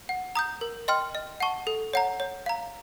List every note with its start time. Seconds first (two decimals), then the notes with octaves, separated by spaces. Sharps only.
0.09 F#5
0.35 A#5 D#6 G6
0.61 A#4
0.88 D#5 G5 C6 F6
1.15 D#5
1.40 F#5 A5 C#6
1.67 A4
1.93 C#5 F#5 A#5
2.20 C#5
2.46 F5 A#5